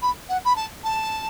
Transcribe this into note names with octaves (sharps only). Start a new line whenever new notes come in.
B5
F#5
B5
A5
A5